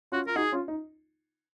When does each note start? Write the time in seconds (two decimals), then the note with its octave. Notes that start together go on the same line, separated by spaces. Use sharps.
0.12 C#4 F4 F#4
0.27 F4 A#4
0.36 D#4 F#4 G#4
0.52 C#4 F4
0.68 D#4